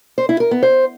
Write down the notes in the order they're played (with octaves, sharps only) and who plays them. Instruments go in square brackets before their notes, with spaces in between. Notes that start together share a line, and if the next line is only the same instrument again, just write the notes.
[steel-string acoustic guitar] C5
E4
A#4
B3
C5